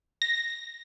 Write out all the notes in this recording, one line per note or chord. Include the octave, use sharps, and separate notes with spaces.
A#6